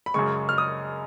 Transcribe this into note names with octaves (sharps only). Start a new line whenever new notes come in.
B5
F#2 C#3 G#3 C#6
F6
D#6